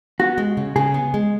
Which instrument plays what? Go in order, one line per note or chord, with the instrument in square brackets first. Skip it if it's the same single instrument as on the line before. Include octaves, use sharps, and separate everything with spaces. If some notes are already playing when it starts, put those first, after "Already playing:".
[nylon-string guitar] B3 [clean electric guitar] F#4
[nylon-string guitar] G#3
C#3
[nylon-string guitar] C#3 [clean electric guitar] G#4
[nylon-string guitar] B3
G#3